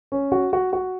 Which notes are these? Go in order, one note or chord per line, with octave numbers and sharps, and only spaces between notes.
C#4
F#4
F#4
F#4